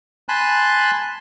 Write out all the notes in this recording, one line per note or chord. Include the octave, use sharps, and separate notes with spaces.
G#5 A5 B5 C6 F#6